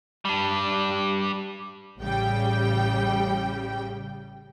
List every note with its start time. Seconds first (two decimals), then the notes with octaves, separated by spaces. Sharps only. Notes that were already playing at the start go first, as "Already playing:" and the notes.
0.25 G3 D4
2.00 A1 C#3 G3 G5